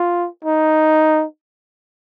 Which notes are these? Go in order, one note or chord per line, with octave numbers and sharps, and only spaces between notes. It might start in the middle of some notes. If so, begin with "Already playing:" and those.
Already playing: F4
D#4